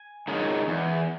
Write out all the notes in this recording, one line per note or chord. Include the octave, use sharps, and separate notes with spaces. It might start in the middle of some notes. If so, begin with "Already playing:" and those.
Already playing: G#5
D#3 G#3 C#4
E2